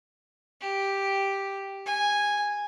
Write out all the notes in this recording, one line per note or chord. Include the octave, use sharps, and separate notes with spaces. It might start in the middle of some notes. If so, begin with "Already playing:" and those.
G4
G#5